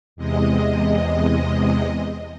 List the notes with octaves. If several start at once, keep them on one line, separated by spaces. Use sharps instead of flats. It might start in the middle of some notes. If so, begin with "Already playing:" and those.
E2 C3 G#3 D#5